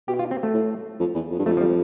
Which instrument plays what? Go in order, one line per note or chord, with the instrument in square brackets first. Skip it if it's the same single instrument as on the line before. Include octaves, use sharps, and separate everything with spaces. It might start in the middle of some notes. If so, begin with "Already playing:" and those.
[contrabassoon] B2 [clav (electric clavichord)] G4
[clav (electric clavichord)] F4
C4
A3
[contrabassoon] A2
F2
E2
F2
G2
[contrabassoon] F2 [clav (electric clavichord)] A3
[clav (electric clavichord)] F3
G3